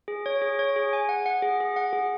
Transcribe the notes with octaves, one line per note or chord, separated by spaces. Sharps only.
G#4
C#5
G#4
C#5
G#4
G#5
F#5
F#5
G#4
G#4
F#5
G#4